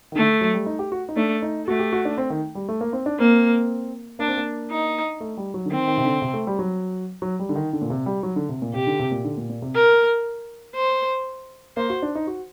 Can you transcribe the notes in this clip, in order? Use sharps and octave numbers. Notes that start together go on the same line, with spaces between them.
D#3
D3 A3
F#3
G3
D#4
G4
F#4
D#4
A3 D4
D#4
A3 F#4
G4
F#4
D4
C4
D#3
G3
A3
A#3
C4
D4
A#3 C4
A#3 D4
C4
A#3
D#4
A3
G3
F#3
D3
D#3 C4
D#3
C3
D3
C3
A3
G3
F#3
F#3
G3
D3
D#3
D3
A#2
C3
G3
F#3
D3
C3
A#2
C3 G4
D3
C3
A#2
D3
A#2
A#2
C3
A#4
C5
A#3 C5
F#4
D4
D#4
F#4